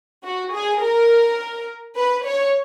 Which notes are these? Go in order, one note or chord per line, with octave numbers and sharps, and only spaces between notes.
F#4
G#4
A#4
B4
C#5